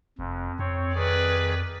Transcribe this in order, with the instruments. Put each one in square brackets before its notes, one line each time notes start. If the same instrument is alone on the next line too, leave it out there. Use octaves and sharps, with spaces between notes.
[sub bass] F1 [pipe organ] F2
[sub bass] F2 [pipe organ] C4 C#5
[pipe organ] D#3 G#4 [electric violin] B4 D5